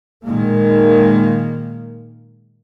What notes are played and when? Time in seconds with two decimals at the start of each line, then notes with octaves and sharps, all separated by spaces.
0.24 A#2 D#3 G#3 A#3